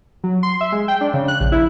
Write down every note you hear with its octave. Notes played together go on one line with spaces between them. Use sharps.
F#3
C6
E5
G#3
G5
D4
C#3
F#6
A#1
E4